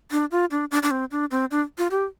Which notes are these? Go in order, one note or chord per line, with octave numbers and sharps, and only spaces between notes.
D4
F4
D4
D4
D4
C4
D4
C4
D4
F4
G4